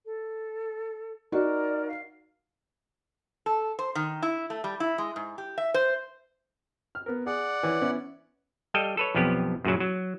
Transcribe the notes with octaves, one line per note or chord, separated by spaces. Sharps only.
A4
D#4 F#4 A#4 D5
F5
A4
C5
D#3
E4
A3
G3
E4
G#3
G#2
G4
E5
C5
F6
B3 A#4
G#4 D5 F#5
E3 C#5
B3 C#4 E4
G3 A4 D#5 F5 G5
A4 B4 C#5
B1 F2 F3 B3 G4
F#2 A#2 C#3 F#3
F#3